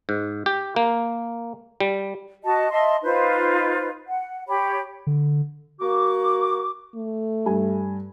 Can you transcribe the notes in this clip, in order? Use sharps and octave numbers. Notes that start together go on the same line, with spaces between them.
G#2
G4
A#3
G3
F#4 D#5 A5
D#5 E5 A5 C6
D#4 F4 B4 C5
F#5
G4 C#5 B5
D3
A#3 F#4 D6
A3
G2 G#5